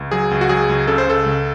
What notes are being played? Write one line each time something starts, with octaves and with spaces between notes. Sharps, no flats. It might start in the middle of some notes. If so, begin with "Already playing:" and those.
Already playing: C#2
F#3 G#4
C#2
F#4
F#3 G#4
C#2
C#3 A4
C5
C#2 A4
C#2